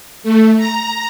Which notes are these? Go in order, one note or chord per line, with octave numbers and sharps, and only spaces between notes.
A3
A#5